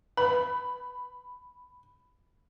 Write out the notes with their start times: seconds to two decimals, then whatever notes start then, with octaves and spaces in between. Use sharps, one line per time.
0.17 B4 B5